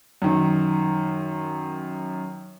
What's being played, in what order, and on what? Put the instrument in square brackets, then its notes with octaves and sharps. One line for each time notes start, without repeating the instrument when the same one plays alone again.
[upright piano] F#2 D#3